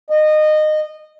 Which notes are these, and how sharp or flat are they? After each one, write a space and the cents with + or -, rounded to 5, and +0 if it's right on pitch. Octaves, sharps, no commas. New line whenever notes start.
D#5 -20